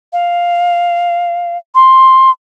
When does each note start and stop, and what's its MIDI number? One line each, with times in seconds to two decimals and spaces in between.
0.13 1.57 77
1.75 2.30 84